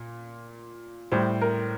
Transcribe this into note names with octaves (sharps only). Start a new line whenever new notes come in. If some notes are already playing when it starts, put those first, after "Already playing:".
Already playing: A#2
A2 G3 C5
A#4